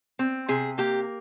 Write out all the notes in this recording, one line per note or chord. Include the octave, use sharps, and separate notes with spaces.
C4
C3 G#4
A#3 G4